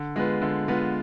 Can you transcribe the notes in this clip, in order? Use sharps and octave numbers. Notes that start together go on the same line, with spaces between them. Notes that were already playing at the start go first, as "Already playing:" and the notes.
Already playing: D3
G#3 B3 F4 B4
D3
G#3 B3 F4 B4